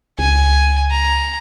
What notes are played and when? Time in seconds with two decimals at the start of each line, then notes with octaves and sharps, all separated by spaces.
0.19 C#2 G#5
0.91 A#5